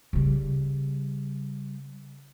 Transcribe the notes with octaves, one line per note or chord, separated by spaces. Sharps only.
C#3 G3